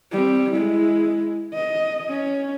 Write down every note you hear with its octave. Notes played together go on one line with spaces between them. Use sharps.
G3 C4
G#3 E4
D#5
C#4